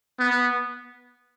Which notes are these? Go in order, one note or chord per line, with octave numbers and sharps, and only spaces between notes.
B3